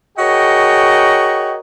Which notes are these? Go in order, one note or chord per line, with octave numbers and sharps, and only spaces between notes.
F#4 G#4 A#4 C#5 D#5 G5